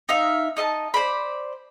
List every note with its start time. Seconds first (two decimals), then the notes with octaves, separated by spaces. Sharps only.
0.09 D#4 E5 F5
0.57 D#4 D#5 E5 A5
0.94 C5 D5 B5